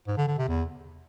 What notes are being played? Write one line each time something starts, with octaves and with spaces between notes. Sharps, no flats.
G#2
D3
D3
C3
E2